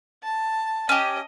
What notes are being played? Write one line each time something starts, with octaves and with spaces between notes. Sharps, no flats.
A5
C#4 G4 D#5